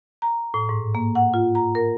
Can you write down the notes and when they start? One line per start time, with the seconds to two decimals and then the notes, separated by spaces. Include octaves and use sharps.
0.22 A#5
0.54 A2
0.69 G#2
0.95 A#3
1.15 F#5
1.34 F4
1.55 A#5
1.75 A#4